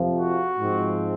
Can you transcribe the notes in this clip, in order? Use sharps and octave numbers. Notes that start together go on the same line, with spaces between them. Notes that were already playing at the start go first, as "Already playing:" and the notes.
Already playing: F2 C3 F3
F#4
G#2 F3 G#3 C4